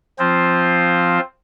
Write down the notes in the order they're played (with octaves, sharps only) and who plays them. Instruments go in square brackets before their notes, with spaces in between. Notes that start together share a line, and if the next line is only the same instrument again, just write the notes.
[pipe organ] F3 C4 F4 C5